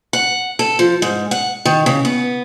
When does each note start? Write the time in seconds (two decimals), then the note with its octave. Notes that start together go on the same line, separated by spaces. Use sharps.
0.13 F#5
0.59 A4
0.79 F3
1.02 G#2
1.31 F#5
1.65 D#3
1.86 C#3
2.05 B3